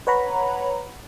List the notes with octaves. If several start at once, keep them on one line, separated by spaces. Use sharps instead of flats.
B4 C#5 F#5 A#5 B5